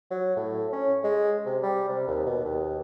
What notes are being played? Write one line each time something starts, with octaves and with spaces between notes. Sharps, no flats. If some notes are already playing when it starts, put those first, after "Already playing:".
F#3
A2
C#4
G#3
C3
G3
C3
D#2
B2
D#2